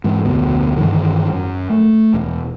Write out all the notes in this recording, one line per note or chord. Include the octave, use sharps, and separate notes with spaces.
G#2 E3
F1 D2 B2
G2 D#3 E3
F#2
A3
E1